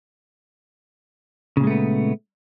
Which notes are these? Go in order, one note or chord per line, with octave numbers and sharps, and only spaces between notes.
A#2 C#3 G#3 A3 B3